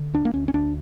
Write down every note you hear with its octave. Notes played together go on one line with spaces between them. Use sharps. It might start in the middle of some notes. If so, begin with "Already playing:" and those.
Already playing: D3
D2 D4
A#3
D2 C#4
C#4
D2 D4